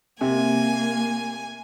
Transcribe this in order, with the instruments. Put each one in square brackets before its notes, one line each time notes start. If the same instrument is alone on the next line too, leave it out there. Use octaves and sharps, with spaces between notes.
[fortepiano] C3 [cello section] A#3 [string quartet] G#5